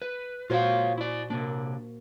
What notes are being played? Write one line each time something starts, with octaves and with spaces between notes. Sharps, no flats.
B4
A#2 F4 F#4 C5 C#5 F5
E4 D5
C3 A#3 D4